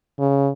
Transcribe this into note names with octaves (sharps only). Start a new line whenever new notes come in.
C#3